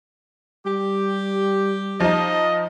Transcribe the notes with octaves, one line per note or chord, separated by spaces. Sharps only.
G3 G4
F3 D#4 D#5